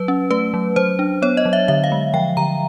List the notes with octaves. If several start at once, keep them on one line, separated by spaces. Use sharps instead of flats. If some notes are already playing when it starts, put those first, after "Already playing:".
Already playing: F#3 B4
C#4
A3 B4
F#3
F#3 C5
D4
B3 C#5
D#5
F#3
E5
D3 E5
F5
G#3
F3 G5
D3 A#5